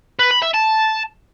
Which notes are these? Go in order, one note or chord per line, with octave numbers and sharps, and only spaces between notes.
B4
B5
E5
A5